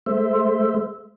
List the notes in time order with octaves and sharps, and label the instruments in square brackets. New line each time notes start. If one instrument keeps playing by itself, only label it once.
[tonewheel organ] G#3 A3 C5 E5